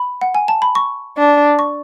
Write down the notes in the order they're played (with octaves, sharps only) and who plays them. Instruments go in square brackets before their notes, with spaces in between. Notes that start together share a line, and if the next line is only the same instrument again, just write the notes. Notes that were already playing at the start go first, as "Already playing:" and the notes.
Already playing: [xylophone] B5
F#5
G#5
A5
B5
C#6
[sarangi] D4
[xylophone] C#6